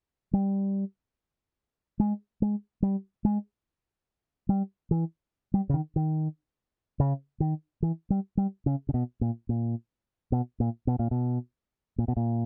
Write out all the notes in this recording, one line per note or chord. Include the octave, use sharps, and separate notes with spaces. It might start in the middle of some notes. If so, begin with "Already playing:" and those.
G3
G#3
G#3
G3
G#3
G3
E3
G3
C#3
D#3
D#3
C#3
D#3
E3
G3
G3
C#3
C#3
B2
A#2
A#2
B2
A#2
B2
A#2
B2
A#2
B2
A#2